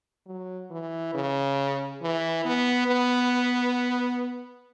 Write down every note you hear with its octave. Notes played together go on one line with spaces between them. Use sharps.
F#3
E3
C#3
E3
B3
B3